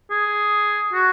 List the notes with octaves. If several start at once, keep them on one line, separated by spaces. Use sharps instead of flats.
G#4
F#4